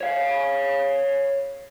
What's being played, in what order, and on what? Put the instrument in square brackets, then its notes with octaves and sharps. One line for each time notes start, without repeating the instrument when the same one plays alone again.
[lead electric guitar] C#5 F5